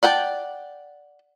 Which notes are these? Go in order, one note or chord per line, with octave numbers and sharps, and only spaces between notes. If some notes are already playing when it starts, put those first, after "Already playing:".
D5 F#5 G5 A5